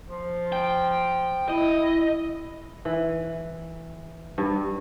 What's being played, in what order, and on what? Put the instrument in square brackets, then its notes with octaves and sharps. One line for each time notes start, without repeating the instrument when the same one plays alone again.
[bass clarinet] F3
[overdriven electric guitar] G5
[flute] E4 [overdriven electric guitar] D#5
[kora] E3
G2